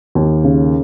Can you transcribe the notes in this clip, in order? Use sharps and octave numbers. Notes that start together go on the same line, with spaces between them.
D#2
C#3